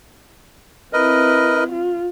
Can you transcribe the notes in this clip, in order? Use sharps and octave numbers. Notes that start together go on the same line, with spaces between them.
C4 E4 A#4 B4 D#5
F4